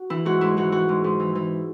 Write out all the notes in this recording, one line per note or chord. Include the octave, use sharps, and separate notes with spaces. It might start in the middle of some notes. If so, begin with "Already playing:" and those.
Already playing: F#4
E3 E4
G#2 F#4
G#2 E4
E3 F#4
E3 F#4
G#2
G#2
E3
E3